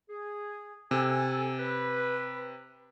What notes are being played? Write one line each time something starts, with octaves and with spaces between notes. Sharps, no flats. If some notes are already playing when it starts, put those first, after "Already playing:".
G#4
C3 A4 G#5
B4